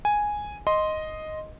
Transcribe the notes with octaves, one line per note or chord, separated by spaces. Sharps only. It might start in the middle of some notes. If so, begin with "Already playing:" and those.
G#5
D#5 C6